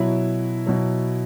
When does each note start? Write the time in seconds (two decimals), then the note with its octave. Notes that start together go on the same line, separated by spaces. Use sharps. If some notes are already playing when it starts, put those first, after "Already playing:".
Already playing: B2 F#3 E4
0.66 B2 F#3